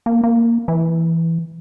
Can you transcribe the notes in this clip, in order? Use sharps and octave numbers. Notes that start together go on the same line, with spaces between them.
A#3
A#3
E3